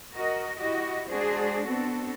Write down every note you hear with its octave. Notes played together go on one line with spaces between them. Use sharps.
F#4 A#4 D#5
E4 F#4 G4 D#5
G#3 D4 F#4 G#4 C5
B3 C4 D4 F#4 A4